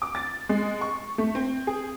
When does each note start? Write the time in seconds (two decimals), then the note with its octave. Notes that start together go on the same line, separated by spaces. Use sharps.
0.02 D6
0.15 A6
0.49 G#3
0.81 C#6
1.18 A3
1.35 C4
1.67 G#4